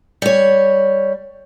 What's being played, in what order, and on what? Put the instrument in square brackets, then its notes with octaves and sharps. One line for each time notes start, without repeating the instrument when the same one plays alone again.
[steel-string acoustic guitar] G3 C#5